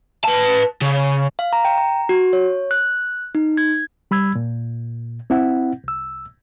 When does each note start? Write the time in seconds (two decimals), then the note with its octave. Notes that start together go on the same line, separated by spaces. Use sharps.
0.24 B4 A5
0.81 C#3
1.39 F5
1.53 A#5
1.65 G5
1.78 A#5
2.09 F#4
2.33 C#5
2.71 F#6
3.35 D#4
3.57 G#6
4.11 G3 B5 E6 G#6
4.35 A#2
5.30 C4 E4 F#5
5.84 C2 E6